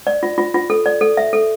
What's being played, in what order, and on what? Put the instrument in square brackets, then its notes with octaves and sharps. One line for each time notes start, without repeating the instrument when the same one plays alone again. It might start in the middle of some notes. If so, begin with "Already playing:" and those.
[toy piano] D5
F4
F4
F4
A4
D5
A4
E5
A4